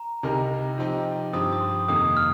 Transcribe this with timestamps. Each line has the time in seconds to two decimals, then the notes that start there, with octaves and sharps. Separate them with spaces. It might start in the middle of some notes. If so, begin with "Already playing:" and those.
Already playing: A#5
0.23 C2 C3 G3 D#4 A#4
0.78 F3 C4 D#4 G4
1.33 G2 F3 C4 G4 D#6
1.53 D#6
1.61 C6
1.88 F2 C3 D#3 A#3 D#6
2.17 F6